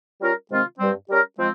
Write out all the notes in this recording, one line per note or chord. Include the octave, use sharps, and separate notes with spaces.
G3 C#4 F4 A#4
C3 D#3 G#3 C4 F4
G2 G3 C4
G3 C#4 G4 A#4
F3 G#3 C4